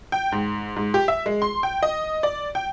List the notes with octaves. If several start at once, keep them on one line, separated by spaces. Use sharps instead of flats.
G5
G#2
G#2
G4
E5
G#3
C6
G5
D#5
D5
G5